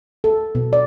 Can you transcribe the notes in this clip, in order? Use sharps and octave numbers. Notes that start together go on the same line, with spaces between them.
A4
B2
D5